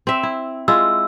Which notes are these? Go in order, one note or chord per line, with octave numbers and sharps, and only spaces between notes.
C4 E5
E4
G#3 E4 F4 E6